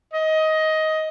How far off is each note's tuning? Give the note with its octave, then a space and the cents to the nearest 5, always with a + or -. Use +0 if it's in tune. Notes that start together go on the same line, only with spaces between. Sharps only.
D#5 +15